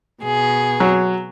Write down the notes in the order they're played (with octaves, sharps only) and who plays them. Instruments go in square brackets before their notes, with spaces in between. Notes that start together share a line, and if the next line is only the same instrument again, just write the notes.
[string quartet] B2 G#4
[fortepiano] F#3